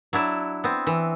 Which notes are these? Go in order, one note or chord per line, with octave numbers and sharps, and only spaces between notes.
F#3 D4 E4
B3 C4
E3